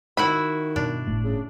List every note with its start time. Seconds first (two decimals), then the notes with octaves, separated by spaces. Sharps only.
0.17 D#3 E4 F#4 E5 B5
0.76 G2 B2 D4
1.07 G1 A2 A3
1.24 C#3